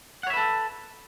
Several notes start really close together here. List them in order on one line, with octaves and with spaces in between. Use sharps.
F#5 C#5 E5 B4 A4